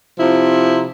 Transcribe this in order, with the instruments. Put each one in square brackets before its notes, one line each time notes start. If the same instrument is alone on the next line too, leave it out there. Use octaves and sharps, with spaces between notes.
[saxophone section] C3 F3 E4